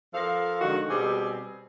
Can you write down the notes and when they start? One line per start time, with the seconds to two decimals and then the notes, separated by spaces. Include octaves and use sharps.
0.14 F3 A4 A#4 F5
0.61 D3 D#3 G#3 F#4
0.90 B2 G3 C4 G4 G#4